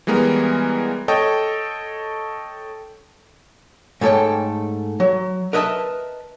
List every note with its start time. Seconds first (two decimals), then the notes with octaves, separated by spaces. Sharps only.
0.07 E3 G3 G#3 B3 A#4
1.08 A4 C#5 D#5 G5
4.01 G#2 A3 A4 C#5 G5
5.00 F#3
5.53 A#4 B4 D#5 E5 G5 A5